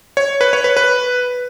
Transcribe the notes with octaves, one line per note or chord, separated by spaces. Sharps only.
C#5
B4
C#5
B4
B4